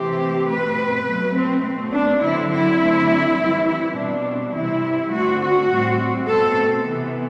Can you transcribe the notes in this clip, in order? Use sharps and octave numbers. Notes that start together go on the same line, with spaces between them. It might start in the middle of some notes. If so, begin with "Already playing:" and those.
Already playing: C3 E3 A3 C4 G4
B2 A3 C4 B4
B2 F#3 A3
C4
B2 A3 C4
D4
D3 F#3 C4 E4
E4
D3 F#3 A3 C4
E3 G3 C4
E4
B2 G3 C4 D4
C3 E3 G3 C4 E4
D3 A3 C4 F#4
F#4
A2 G3 C4
B2 A3 C4 A4
C3 E3 B3